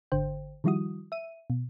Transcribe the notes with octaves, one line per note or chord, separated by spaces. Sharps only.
G#1 D3 C5 G5
D#3 F3 G3 E4 F#4 D#6
E5 D#7
B2